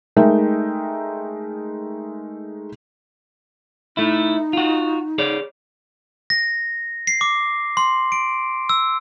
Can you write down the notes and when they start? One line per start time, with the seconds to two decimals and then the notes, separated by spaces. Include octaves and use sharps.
0.16 G#3 A3 D#4 A#4 E5 G5
3.97 A3 D#4 E4
4.53 F4 F#4
5.18 G#4 C#5 D5
6.30 A#6
7.07 C7
7.21 D6
7.77 C6
8.12 D7
8.69 E6